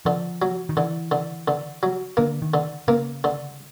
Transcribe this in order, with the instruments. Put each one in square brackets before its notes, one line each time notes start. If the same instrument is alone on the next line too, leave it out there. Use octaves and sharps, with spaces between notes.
[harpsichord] D3 [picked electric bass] F3
[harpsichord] F#3
[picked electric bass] D#3
[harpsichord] D3 [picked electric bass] E3
[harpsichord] D3
D3
F#3
[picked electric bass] D3 [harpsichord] A#3
[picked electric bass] D#3
[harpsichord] D3
[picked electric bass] C#3 [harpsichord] A#3
[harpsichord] D3